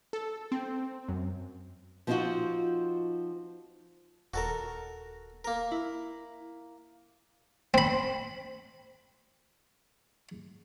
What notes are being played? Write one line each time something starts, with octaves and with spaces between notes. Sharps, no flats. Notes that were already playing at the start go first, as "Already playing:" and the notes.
A4
C4
F#2
F3 B3 C4 D#4 F4 F#4
D#1 F#4 A4 A#4
A#3 A#4
E4
C4 B5